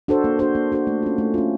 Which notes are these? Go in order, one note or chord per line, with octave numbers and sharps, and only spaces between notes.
D4 F#4 A4 C5
A#3
D4 F#4 A4 C5
A#3
D4 F#4 A4 C5
A3
C#4 F4
A3
C#4 F4